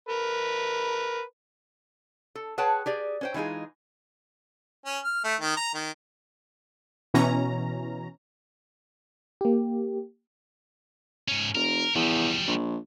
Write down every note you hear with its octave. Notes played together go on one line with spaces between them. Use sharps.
A#4 B4
A4
G#4 B4 C#5 F#5 G5 A5
G4 G#4 D5
C#4 C5 G5
E3 G#3 D#4 F4 G#4
C#4
F6
A3
D#3
A#5
D#3
B2 E3 C#4 A#5
A#3 G4
G#2 C#4
F1 A#4
E2 F3 G3
A#1